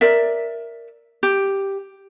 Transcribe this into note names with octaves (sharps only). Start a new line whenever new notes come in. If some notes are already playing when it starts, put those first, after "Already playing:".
A#4 D5 E5
G4